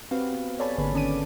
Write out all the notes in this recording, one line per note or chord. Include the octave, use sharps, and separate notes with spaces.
C4 F#4 G4 B4 F5
B3
A4 C#5 D5 G#5 A5 B5
G#1 D3 A#3 G#4 B4 B5
D#3 C#4 D5 A5 D6 D#7